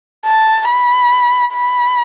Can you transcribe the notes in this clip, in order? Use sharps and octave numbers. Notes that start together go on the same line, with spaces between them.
A5
B5
B5